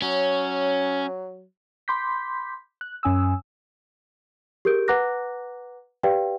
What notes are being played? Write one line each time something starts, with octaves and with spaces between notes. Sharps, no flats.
F#3 C#4
B5 C6 D6 G6 B6
F#6
F#2 C#4 G#5 D#6 E6
G4 G#4 A#4 G6 D7
B4 F#5 A#5 D6 F#6 A#6
G4 B4 D5 F5 G5